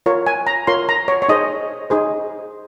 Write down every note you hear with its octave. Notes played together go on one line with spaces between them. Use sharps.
F4 A#4 C#5
G#5
A#5
F4 A#4 C#5 C6
A#5
C#5
C#5
D#4 G#4 C5 D#5
D#4 G#4 C5